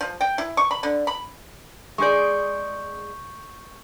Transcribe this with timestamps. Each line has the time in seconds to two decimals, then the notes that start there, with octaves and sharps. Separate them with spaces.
0.01 F3
0.21 G5
0.38 E4
0.57 C#6
0.71 B5
0.83 D3
1.07 B5
1.98 G#3 G#4 D5 C#6 G6